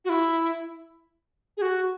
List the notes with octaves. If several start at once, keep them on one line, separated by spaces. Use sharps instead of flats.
F#4
E4
G#4
F#4